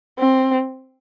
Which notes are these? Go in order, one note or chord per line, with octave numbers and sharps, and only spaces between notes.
C4